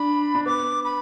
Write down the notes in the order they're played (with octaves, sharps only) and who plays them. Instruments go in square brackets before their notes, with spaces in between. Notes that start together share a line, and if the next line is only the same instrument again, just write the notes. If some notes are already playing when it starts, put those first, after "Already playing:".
Already playing: [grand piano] D4 [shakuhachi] B5
[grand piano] D4
[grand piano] B3 [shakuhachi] D6
[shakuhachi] B5